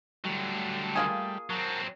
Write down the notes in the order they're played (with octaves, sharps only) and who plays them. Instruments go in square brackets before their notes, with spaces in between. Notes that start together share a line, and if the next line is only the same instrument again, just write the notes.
[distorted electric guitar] D3 F#3 [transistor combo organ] G3 A3
[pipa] A#3 F4 G#4
[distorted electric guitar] F#3 C4 [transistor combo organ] F#4 A#4 A5